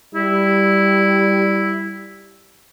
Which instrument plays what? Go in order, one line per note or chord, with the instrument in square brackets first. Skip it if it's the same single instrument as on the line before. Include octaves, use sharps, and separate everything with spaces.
[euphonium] G3 [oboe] E4